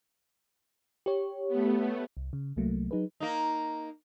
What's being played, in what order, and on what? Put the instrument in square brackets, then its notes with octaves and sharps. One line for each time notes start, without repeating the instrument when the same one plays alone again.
[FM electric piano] G4 C#5
[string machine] A3 B3
[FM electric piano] C2
C#3
C2 C3 F#3 A3 A#3
F#3 D#4 G#4 B4
[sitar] A#3 D#4